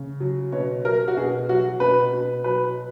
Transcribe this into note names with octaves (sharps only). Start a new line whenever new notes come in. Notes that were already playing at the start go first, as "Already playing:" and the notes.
Already playing: C#3
F#3
B2 C#5
F#3 A#4
F#4
B2 G#4
F#3 F#4
B2 B4
B2
F#3 B4